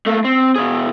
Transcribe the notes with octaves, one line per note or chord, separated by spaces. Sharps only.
A3 A#3
C4
B2 G#4